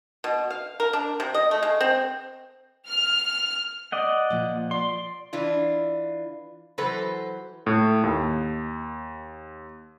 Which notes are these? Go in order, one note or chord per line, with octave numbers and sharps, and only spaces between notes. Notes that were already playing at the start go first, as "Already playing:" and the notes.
B2
F5
A#4
D4
C3
D#5
A3
G#3
C4
F6
D5 D#5 F#5
A#2 F3
D5 C6
E3 D4 F4
E3 F#3 A4 B4 C5
A2
D#2